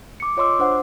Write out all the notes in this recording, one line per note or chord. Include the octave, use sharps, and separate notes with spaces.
D6 C#7
F4 C#5 D#5 C6 D6 E6
D4 C5 F#5